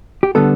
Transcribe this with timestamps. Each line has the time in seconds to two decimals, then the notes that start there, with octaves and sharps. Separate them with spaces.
0.23 G4
0.35 D3 G3 B3 A4